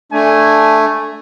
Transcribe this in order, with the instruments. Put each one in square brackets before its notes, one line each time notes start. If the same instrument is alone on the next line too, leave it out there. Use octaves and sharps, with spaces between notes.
[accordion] A3 [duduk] D4 [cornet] G#5